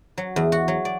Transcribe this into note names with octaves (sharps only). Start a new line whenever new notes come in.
F#3
E2
F#4
F#3
D5